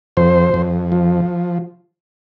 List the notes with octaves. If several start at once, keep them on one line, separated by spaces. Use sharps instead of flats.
F2 C5
F2
F3